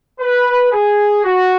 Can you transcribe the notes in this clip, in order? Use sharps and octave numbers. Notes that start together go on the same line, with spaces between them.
B4
G#4
F#4